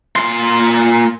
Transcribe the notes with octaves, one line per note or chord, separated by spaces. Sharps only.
A#2 C6